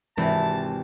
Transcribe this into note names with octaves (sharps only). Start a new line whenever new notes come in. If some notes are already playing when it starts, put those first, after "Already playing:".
G#1 C3 E3 A5